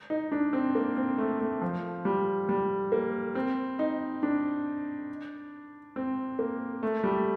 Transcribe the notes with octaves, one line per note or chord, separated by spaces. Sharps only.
D#4
D4
C4
A#3
C4
A3
A3
F3
G3
G3
A#3
C4
D#4
D4
C4
A#3
A3
G3